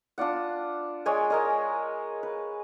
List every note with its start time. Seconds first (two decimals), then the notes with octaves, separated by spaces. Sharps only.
0.18 D4 F4 D5 F#5
1.06 G#3 C#5 D5 G#5
1.30 G#3 A#4 D#5
2.23 B4